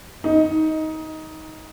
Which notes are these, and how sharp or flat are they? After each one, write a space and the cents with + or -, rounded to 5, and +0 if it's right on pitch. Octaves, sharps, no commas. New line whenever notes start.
D#4 +15